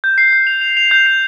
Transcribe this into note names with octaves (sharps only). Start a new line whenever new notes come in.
G6
C7
G6
F7
F7
F7
G6
C7